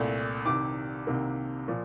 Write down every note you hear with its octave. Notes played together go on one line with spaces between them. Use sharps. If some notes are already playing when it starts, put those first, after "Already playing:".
Already playing: C2 A#2 A3
C2 C3 D#3 D6
C2 C3 D#3 A#3
A#2 F3